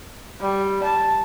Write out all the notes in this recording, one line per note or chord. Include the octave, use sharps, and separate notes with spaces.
G3
A5